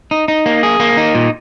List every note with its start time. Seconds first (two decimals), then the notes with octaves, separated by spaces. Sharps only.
0.11 D#4
0.28 D#4
0.46 A#3
0.63 G#4
0.80 A#3
0.97 D#4
1.15 A#2